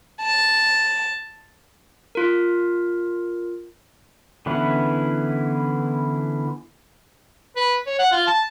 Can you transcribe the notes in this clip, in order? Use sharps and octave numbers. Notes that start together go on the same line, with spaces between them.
A5
F4 A#4
D3 E3 B3 C#4 E4
B4
C#5
F#5
F4
A5